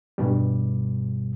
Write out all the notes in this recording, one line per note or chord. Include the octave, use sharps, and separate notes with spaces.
G2 B2 G3